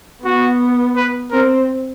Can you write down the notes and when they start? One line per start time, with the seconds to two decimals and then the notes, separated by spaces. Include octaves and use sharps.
0.24 B3 F#4
0.96 B4
1.32 C4 A#4